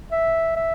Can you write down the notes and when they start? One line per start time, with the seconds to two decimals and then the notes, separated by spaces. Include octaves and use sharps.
0.11 E5
0.56 E5